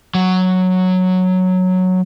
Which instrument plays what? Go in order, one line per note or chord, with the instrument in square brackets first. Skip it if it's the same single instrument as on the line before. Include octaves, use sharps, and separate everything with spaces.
[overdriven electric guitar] F#3